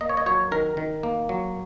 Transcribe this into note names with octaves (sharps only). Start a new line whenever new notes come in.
A#3 D#5
C#5
D#5
F#3 C#5
D#3 A#4
D#3
A#3
F#3